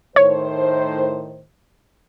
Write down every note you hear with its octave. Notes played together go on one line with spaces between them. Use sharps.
A2 D#3 C5 C#5